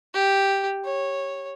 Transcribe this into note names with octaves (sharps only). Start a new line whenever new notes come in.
G4
C#5